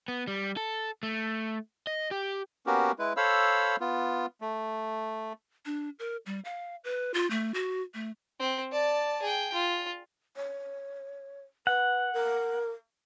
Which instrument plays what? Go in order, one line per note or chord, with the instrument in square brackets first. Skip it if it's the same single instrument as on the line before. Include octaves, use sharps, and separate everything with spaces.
[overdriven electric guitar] B3
G3
A4
A3
D#5
G4
[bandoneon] A#3 B3 C#4 F#4 G4 A#4
G#3 E4 B4
A4 C5 C#5 F5 B5 E6
B3 F4
A3
[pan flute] D4
A#4
G3
F5
B4
F4
A3
F#4
A3
[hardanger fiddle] C4
D5 A5
G#4 G5
F4
[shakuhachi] C#5
[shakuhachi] B4 [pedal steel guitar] F#5
[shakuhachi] A#4